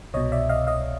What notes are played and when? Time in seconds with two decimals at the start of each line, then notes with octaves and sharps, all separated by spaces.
0.14 C2 B2 C#5 D#5
0.32 D5 E5
0.49 D#5 F5
0.67 D#5 F5